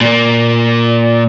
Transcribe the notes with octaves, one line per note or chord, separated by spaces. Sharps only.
A#2 A#3